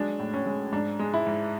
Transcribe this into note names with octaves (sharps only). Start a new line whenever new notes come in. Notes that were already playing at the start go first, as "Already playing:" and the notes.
Already playing: F#3 G#3 D4
A2
C#4
G#3
G#2 D4
G#3
E4
G#2